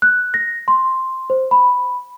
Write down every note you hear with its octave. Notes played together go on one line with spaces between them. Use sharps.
F#6
A#6
C6
C5
B5